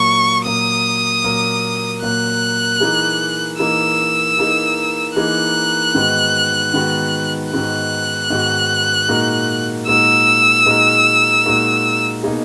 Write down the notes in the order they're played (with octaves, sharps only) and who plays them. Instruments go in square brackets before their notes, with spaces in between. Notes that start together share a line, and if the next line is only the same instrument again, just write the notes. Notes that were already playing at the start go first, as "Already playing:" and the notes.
Already playing: [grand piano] A#2 F#3 A#3 [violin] C#6
[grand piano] A#2 F#3 A#3 [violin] D#6
[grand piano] A#2 F#3 A#3
[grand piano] A#2 F#3 A#3 [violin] F#6
[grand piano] E3 A#3 D#4 G#4
[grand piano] E3 A#3 D#4 G#4 [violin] E6
[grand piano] E3 A#3 D#4 G#4
[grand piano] E3 A#3 D#4 G#4 [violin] F#6
[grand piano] G#2 D#3 G#3 B3 F#4
G#2 D#3 G#3 B3 F#4
[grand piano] G#2 D#3 G#3 B3 F#4 [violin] F#6
[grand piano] G#2 D#3 G#3 B3 F#4
A#2 G#3 D#4 F#4 A#4
[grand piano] A#2 G#3 D#4 F#4 A#4 [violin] E6
[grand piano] A#2 G#3 D#4 F#4 A#4
A#2 G#3 D#4 F#4 A#4
B2 A#3 D#4 G#4